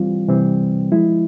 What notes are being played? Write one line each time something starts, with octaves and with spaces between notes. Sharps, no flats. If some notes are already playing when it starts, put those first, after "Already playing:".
Already playing: E3 G3 C4 F4
C3 E3 G3 C4
F3 G#3 E4